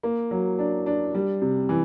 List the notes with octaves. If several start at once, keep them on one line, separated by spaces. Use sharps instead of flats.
A#3
F#3
D4
D4
G3
C3
E3